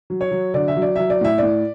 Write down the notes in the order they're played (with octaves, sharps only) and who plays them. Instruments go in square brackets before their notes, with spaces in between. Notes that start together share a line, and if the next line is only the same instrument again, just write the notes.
[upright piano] F#3
C#5
F#3
D3 D5
E5
F#3
D5
F#3 E5
D5
A2 E5
A2 D5